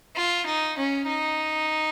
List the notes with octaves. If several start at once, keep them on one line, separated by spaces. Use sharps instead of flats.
F4
D#4
C#4
D#4